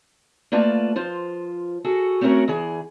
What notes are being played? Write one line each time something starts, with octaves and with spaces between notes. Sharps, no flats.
A3 A#3 F4 B4 D5 A5
F3 F4 C5
F#4 G#4 A4
A3 C4 C#4 F#4 A#4 C#5
E2 E3 G#4